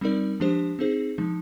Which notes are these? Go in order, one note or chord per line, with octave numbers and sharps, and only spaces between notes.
G3 C4 D#4 A#4 D5
F3 G#3 D4 G4 C5
C4 D#4 G#4 C5
F3 G#3 D#4